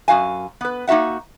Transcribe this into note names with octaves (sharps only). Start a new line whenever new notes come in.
F#2 F#4 F5 G#5
B3 B4
A#3 D#4 F#4 E5 F#5